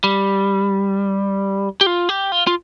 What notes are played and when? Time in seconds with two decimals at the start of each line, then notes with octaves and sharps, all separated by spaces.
0.04 G3
1.81 G4
1.87 F4
2.09 G4
2.32 F4
2.47 F4